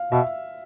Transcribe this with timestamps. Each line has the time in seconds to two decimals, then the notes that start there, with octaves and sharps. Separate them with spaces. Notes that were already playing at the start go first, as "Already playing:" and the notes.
Already playing: F5
0.12 B2 E5